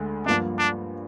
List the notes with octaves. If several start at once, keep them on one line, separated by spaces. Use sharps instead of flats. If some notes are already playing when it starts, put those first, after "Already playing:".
Already playing: D2 D3 G#3
G2 F3 A#3 D4
D4